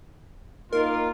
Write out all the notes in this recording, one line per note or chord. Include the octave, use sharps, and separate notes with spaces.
A#3 D#4 F4 A#4